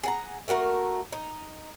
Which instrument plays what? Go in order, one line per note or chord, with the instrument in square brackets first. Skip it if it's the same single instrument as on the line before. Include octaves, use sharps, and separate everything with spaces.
[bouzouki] G#4 F#5 A#5
A3 A#3 F#4 A#4
D#4